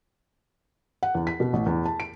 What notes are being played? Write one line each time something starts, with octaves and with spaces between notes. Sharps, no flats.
F#5
E2
B6
B2
A1
E2
A5
D7